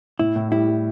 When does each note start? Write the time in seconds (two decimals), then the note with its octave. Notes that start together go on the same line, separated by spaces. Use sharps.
0.19 A2 E4
0.36 A2
0.52 G3 E4
0.68 G3